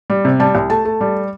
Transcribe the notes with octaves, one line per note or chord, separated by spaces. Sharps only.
G3
C3
G3 A5
C2
A3 A5
A3
G3